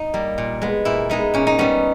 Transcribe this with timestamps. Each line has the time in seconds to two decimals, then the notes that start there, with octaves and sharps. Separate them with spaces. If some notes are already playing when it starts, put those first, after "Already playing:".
Already playing: D#4
0.14 G3 A#3
0.38 A#2
0.62 G#3 B3
0.85 A#2 E4
1.10 G#3 B3 D#4
1.34 A#2 C#4
1.47 D#4
1.59 G3 B3 C#4